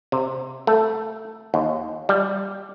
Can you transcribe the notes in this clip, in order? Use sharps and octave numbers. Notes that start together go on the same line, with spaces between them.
C3
A3
D#2
G3